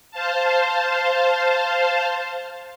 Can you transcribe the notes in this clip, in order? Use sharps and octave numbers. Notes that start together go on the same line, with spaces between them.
C5 F5 A5